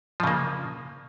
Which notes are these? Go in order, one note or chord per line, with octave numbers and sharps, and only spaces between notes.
C#3 F3 A#3